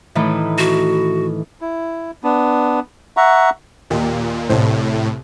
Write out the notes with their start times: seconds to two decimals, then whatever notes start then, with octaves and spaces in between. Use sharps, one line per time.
0.15 A2 D#3 E3
0.58 F#4
1.61 E4
2.24 B3 D4
3.17 E5 F#5 A#5 C#6
3.90 D#2 A#2 G4
4.49 C2 A2 C5